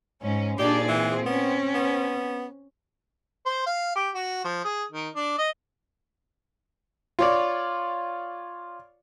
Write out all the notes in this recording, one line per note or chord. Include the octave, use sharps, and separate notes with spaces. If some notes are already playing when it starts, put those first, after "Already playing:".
G#2 C#4
A#2 D4 D#4 G4 G#4 D5
E3 C4
B3 C#4
B3
C5
F5
G4
F#4
F3
G#4
D#3
D4
D#5
F4 C#5 D5